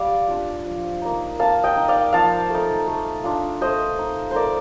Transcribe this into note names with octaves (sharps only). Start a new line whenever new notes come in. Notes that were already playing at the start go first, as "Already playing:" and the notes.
Already playing: G3 D5 F5
D4 F4
F3
A#3 D#4
A#3 F5 A5
D#5 G5
D#4
D5 F5
F3 F5 A5
A3 D#4
A3
D4 F4
A3 C5 D#5
D#4
A3 A#4 C5 D5